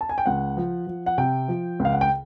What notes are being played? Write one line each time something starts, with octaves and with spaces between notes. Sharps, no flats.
A5
G#5
G5
C#2 F#5
F3
F3
F#5
C3 G5
F3
C#2
F5
F#5
G5